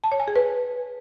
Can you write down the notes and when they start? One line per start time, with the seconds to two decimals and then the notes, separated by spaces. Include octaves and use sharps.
0.04 A5
0.12 C#5
0.20 G#5
0.28 G#4
0.36 B4